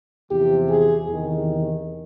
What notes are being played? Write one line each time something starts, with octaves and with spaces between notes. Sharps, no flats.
E2 C3 F3 G4
G#4
E2 C3 D#3